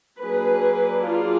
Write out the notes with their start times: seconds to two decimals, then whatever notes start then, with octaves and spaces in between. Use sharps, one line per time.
0.20 F#3 A#3 D4 G#4 B4
1.02 F4 G#4